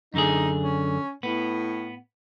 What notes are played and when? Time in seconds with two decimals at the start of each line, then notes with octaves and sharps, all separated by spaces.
0.14 F#2 D3 D#4 G#4
0.62 C#4
1.23 A2 B3